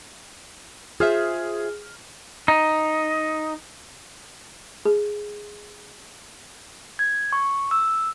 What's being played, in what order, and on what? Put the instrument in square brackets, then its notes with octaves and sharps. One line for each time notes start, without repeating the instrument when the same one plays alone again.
[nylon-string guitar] F4 C5 E5 [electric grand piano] G#4 F6
[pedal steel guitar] D#4
[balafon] G#4
[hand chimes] G#6
C#6
E6